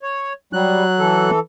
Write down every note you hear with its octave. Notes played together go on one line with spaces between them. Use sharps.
C#5
F#3 G3 F#6
E3 A4